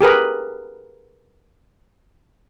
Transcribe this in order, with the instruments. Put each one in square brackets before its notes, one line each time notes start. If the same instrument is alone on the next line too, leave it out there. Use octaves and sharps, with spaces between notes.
[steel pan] G4 G#4 A#4 B4